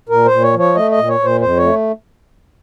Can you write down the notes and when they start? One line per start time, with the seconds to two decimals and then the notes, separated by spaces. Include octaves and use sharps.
0.09 A#2 A#4
0.25 C5
0.31 A#2
0.42 C#5
0.53 F3
0.59 C#5
0.75 A3 D#5
0.91 D#5
0.98 A#2
1.09 C#5
1.20 A#2 C5
1.41 F2 C5
1.57 C#5
1.63 A3